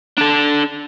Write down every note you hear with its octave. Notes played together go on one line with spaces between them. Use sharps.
D4 A4